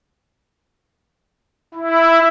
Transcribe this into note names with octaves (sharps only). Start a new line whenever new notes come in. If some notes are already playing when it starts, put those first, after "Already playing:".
E4